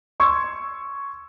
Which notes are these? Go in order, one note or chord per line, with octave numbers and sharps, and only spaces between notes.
C6 C#6 E6 G#6 C#7